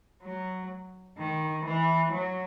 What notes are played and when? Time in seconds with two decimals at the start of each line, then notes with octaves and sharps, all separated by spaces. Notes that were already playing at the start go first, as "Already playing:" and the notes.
0.23 F#3
1.18 D#3
1.65 E3
2.12 F#3